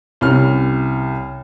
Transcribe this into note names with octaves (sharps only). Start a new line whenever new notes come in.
C2 C#4 F6